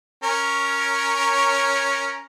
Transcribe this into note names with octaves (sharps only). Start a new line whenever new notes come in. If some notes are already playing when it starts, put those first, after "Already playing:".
C#4 A#4 C#5